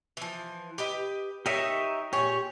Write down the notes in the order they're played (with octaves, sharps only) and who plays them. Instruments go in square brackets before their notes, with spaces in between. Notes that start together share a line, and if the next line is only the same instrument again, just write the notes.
[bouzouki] E3 F3
G4 B4 D#5
[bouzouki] D#4 A#4 C#5 [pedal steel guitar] G4 D#5 E5
[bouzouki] A#2 G#4 C#5 [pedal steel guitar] G4